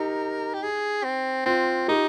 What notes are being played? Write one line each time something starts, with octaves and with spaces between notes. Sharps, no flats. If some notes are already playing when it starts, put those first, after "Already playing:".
Already playing: D#4 G4 A#4
G4
G#4
C4
C4 F4
D#4 G4